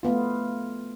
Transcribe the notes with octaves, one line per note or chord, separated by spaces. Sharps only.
A3 B3 F4